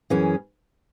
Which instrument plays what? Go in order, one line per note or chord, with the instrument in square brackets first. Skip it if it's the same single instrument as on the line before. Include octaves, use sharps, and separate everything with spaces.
[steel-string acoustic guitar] F#2 E3 C#4 G#4